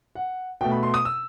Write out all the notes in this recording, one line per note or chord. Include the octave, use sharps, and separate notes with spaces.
F#5
B2 A3 G5
B5
C6
D#6
E6